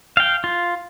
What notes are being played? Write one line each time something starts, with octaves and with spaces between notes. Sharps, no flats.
F5 G5
F4